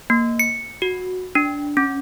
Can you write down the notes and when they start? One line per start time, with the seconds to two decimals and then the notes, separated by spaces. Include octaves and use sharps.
0.10 A#3
0.39 C#7
0.82 F#4
1.35 D4
1.77 C#4